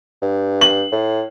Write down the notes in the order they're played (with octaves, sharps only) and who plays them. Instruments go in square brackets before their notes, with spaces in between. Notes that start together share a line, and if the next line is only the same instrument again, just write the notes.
[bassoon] G2
[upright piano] F#7
[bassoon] A2